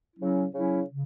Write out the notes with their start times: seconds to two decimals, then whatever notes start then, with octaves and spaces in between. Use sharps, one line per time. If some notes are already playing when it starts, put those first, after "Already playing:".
0.16 C#3 F#3 C#4 E4
0.52 C#3 F#3 C#4 E4
0.89 C#3